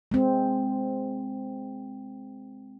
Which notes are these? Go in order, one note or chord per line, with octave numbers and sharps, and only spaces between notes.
G#3 C4